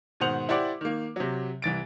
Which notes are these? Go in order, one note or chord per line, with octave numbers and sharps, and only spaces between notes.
G#2 B2 D#3 C5 F#5 F7
E4 G4 C5 D5 F#5 D6
D#3 A#3
C3 F#3
C2 E3 A6 D7